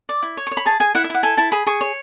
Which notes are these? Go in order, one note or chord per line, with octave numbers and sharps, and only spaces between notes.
D5
E4
C#5
C#6
C#5
B5
G#4 A5
G#4 G#5
E4 F#5
E5
E4 F#5
A4 G#5
E4 A5
G#4 B5
G#4 C#6
C#5